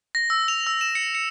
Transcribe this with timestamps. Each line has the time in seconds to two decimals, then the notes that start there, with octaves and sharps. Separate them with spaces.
0.15 A#6
0.30 E6
0.48 F7
0.67 E6
0.81 E7
0.95 C#7
1.15 C#7